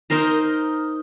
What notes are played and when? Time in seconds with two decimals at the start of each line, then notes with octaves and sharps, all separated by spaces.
0.10 D#4 A#4 C5 A#5